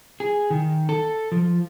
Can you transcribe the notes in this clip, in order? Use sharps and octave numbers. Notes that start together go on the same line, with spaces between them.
G#4
D#3
A4
F3